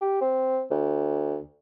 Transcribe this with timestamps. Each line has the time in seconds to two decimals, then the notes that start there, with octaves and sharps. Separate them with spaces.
0.01 G4
0.21 C4
0.71 D2